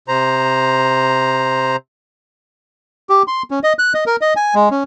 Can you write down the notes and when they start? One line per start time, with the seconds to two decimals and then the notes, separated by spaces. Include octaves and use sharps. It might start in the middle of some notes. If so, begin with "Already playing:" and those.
0.08 C3 C5 A#5
3.10 G4
3.28 C6
3.51 C#4
3.64 D#5
3.79 F#6
3.94 D#5
4.06 A#4
4.21 D#5
4.36 G#5
4.55 G#3
4.71 C#4